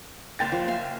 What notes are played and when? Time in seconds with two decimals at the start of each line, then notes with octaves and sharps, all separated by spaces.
0.39 F#1 G5 A6
0.52 F3
0.68 E5 F5 G#5